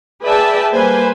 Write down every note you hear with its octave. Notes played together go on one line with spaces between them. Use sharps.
G#4 B4 D5 E5 G5 A5
G3 A#3 B4 C5 G#5